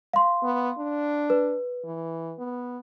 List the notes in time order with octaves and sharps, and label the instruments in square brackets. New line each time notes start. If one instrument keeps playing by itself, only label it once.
[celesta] F5 C6
[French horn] B3
D4
[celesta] B4
[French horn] E3
B3